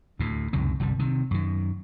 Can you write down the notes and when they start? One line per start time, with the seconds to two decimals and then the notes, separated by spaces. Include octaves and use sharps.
0.19 D2 A2
0.53 C#2 F#2 C3 D#3
0.80 G1 C2 C3 G3
0.99 C3 D#3
1.31 F#2 D#3